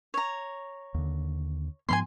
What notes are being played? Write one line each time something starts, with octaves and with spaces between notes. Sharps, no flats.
C#5 A#5
D#2 D3
G#2 F3 B3 G#5 B5 C6